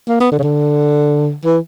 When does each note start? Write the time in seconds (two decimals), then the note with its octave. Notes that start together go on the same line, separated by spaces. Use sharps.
0.09 A#3
0.20 B3
0.32 D3
0.39 C#3
0.43 D3
1.45 E3